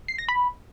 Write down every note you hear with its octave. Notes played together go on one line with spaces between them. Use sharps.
C7
A#6
B5